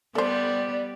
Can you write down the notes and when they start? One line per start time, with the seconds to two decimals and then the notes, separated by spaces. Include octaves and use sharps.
0.15 G3 B3 G4 A4 C5 D5